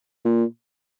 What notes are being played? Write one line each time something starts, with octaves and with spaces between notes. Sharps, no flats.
A#2